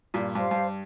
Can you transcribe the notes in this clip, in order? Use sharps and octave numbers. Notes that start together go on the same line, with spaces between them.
G2 A#2
G2 G4 C5 F5
G2